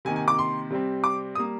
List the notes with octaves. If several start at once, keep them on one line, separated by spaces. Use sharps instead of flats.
C3 D#3 A#3 G#5
G#5
D6
C6
C3 G3 C4
D6
G3 A#3 D#6